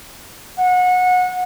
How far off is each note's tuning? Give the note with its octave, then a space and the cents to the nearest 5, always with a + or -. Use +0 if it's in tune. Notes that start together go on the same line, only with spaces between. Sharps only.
F#5 -25